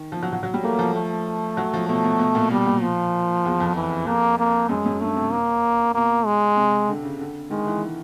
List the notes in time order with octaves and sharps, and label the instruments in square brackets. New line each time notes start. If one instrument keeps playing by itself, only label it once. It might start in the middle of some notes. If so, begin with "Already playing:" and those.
Already playing: [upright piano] D#3
F3
F#3
F#3
F#3
G3
[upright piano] A3 [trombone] A#3
[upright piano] F3
[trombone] A3
[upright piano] F#3
F3
[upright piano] B2 [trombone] A3
[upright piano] B2
B2
A#2
[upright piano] B2 [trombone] G3
[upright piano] A#2
[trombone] F3
[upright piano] E2
F2
[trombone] E3
[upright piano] F2 [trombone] A#3
[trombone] A#3
[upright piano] F#2 [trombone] G#3
[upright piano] F#2
[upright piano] G2 [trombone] A3
[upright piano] C3
[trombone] A#3
[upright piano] B2 [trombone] A#3
[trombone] G#3
[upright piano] C3
D3
C#3
D3
[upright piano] D#3 [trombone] G#3
[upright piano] E3